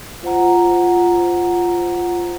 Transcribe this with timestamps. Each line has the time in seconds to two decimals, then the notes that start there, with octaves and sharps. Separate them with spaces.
0.23 F4 C5 F#5 A#5